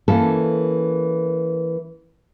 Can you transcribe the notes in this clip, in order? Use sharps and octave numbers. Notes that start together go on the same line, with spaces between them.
E3 A#3 C#4 A4